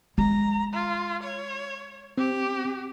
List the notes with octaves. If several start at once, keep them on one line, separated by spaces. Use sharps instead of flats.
G#3 A#5
F4
C#5
C4 G4